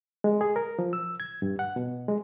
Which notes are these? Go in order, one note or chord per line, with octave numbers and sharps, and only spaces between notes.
G#3
G#4
A#4
F3
E6
G#6
G2
F#5
B2
G#3